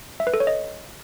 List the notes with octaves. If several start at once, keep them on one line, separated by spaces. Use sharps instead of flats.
E5
B4
A4
C#5
D#5